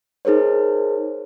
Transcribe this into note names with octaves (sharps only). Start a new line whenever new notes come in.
D#4 G#4 A#4 C5 C#5